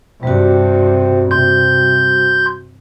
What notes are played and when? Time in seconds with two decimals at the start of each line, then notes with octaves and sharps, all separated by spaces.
0.23 G2 C3 G3 F#4
1.31 C3 C6 G6